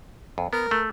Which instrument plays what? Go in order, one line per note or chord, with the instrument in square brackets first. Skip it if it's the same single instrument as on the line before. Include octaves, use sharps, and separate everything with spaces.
[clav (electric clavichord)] F2
[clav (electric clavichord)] B3 [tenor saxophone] A#4
[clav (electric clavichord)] A3